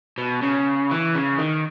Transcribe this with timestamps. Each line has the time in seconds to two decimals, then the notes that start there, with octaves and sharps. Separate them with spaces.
0.18 B2
0.42 C#3
0.91 E3
1.15 C#3
1.38 D#3